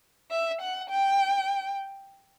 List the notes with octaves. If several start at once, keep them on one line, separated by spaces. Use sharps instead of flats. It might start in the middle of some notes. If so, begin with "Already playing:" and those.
E5
F#5
G5